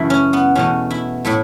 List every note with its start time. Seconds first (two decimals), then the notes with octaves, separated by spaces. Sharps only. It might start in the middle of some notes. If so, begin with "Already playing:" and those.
Already playing: F#2 C#3 E3 A3 E4
0.10 C#4
0.33 B3
0.55 E2 B2 A3 C#4
0.91 E4
1.25 A2 A3 E4